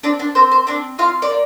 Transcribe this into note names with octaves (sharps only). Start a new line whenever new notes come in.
C4 D4 D5
D4 D5
C4 C5
C5
C4 D4 D5
C4 F4 F5
D5
A#3